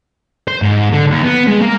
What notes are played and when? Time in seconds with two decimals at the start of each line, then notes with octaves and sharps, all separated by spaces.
0.48 C5
0.62 G#2
0.93 D3
1.11 D#2
1.23 B3
1.47 G#3
1.61 A#3